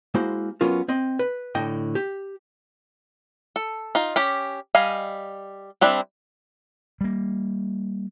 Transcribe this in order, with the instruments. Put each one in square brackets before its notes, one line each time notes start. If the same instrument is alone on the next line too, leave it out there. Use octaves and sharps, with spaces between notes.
[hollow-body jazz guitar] G#3 A#3 E4 F#4 C5
F#3 B3 C#4 F4 A#4
C4 D#5
B4
A2 D3 D#5 G5
G4
[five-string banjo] A4
D#4 F4
C#4 G4
G3 D#5 F5 G#5
G3 C4 D4 E4
[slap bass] G3 A#3